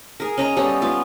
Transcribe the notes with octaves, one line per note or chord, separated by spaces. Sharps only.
G#4 A#4
C#4 D#5 A#5
G3 B3 C#4 A4
B3 F4